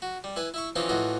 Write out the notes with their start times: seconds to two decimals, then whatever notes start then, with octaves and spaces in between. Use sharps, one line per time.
0.02 F#4
0.24 G3
0.36 E4 B4 G#5
0.54 E4 E5 C#6
0.76 E3 C4 C#4 D#4 F4 G4
0.89 A2 E3 F4 F#4 D#5